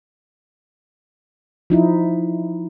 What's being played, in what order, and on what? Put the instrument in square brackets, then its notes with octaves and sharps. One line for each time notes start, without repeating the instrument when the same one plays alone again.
[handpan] F3 D#4 E4